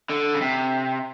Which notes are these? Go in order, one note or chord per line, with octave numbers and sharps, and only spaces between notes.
D3
C#3
C3